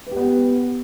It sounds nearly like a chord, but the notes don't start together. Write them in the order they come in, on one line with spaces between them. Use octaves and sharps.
B4 G4 B3